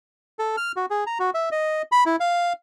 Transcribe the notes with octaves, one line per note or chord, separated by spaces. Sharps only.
A4
F6
F#4
G#4
A#5
F#4
E5
D#5
B5
E4
F5